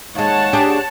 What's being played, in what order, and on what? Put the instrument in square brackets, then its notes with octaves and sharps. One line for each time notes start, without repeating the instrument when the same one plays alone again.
[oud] D#2 G#3 [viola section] C#5 F#5 A5
[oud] D4 G4 G#4